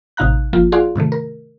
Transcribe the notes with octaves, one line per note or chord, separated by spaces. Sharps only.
A1 C3 D#4 F5 A#5 F#6
G1 F3 A#3 F4
F4 F#4 G#4 D5 F5 C6
G#2 C3 D#3 A3
A#4